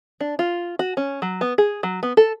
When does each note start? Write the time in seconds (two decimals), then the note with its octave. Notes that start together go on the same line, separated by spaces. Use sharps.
0.21 D4
0.39 F4
0.79 F#4
0.97 C#4
1.22 F#3
1.41 B3
1.58 G#4
1.83 F#3
2.03 B3
2.17 A4